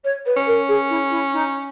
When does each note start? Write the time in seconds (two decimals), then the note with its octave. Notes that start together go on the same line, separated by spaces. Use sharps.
0.04 C#5
0.25 B4
0.37 C#4
0.46 A#4
0.68 G#4
0.89 E4
1.10 E4
1.32 D#4